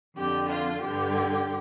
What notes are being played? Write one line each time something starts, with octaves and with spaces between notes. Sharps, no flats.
F2 D3 G4
F4
G2 D3 G4